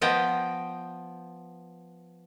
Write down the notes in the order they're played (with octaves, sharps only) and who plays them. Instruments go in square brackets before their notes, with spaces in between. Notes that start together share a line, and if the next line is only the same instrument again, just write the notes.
[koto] F3 B3 D#5 G5